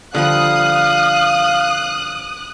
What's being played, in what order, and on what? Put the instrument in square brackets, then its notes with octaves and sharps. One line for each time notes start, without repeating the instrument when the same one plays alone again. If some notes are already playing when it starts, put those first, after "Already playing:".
[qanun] D3 F3 G3 [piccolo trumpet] F5 [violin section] D#6 F#6